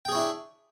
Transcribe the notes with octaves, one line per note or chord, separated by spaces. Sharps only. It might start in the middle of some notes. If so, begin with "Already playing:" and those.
D4 E4 G#4 C#5 G5